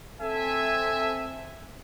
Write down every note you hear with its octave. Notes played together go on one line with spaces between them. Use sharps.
C4 A4 E5 G#5